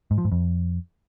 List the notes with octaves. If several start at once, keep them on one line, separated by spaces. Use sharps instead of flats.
G#2
F3
G#2
F2